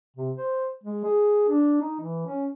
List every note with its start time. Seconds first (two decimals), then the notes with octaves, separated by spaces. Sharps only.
0.17 C3
0.37 C5
0.84 G#3
1.04 G#4
1.49 D4
1.81 D#4
2.01 E3
2.27 C#4